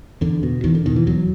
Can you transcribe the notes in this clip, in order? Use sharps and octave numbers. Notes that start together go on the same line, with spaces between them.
E2 D3
B2
E2 D#3
D3
B2 D#3
E3
E2 F#3